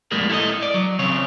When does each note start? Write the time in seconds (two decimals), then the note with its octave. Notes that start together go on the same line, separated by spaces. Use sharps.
0.11 F2 A2 G3 G#3 A#3
0.29 E4 A4 A#4 D#5
0.63 D5
0.74 F#3
0.99 C#3 C4 C#5